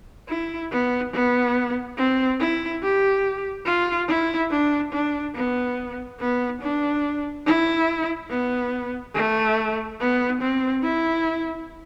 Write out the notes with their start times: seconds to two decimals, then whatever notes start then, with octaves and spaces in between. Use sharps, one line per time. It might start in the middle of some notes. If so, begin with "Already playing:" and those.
0.28 E4
0.71 B3
1.13 B3
1.97 C4
2.40 E4
2.83 G4
3.66 F4
4.08 E4
4.51 D4
4.93 D4
5.35 B3
6.20 B3
6.62 D4
7.46 E4
8.30 B3
9.15 A3
10.00 B3
10.41 C4
10.84 E4